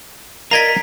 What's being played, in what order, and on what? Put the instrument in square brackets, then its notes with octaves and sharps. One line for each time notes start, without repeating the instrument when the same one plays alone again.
[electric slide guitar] A#4 [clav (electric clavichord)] D5 D#5 F5 [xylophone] A#5 G#6 B6